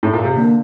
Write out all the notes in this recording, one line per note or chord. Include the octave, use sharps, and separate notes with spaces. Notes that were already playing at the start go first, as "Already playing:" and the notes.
A2
A#2
C3
D3 A#3